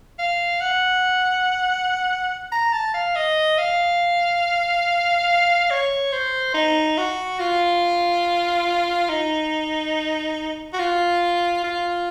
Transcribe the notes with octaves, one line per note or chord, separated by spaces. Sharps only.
F5
F#5
A#5
A5
F5
D#5
F5
C#5
C5
D#4
F#4
F4
D#4
F#4
F4
F4